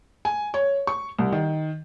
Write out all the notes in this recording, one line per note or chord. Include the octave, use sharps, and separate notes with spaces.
G#5
C#5
C#6
C2
D#3